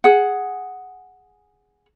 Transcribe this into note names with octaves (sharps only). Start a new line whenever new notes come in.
G#4 F#5